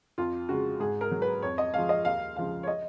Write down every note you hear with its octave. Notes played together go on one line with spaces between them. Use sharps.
F2 F4
C#3 G#3 F#4
G#2 G#4
A#4
F#3
B4
F2 C#5
D#5
F3 G#3 F5
D#5
D#2 F5
C#3 F3 G#3 F5
C#5
D#5